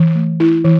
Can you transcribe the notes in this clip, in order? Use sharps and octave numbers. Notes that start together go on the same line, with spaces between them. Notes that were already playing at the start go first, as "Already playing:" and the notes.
Already playing: E3
A3
E4
E3